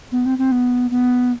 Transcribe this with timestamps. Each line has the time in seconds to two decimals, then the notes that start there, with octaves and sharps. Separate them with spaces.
0.12 B3
0.26 C4
0.38 C4
0.52 B3
0.91 B3